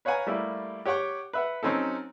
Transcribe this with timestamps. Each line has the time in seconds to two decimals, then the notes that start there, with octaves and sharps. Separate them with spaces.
0.05 B4 C#5 F5 F#5 G#5 A#5
0.27 G3 A3 A#3 E4 G4
0.85 G4 C#5 F#5 G5 C#6
1.33 B4 E5 F#5
1.63 F#3 C4 C#4 D#4 A4